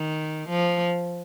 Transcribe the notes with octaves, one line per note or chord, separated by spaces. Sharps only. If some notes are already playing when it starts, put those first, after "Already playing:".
Already playing: D#3
F3